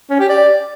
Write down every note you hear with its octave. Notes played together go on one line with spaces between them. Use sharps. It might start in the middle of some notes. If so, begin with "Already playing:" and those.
C#4
G4
D5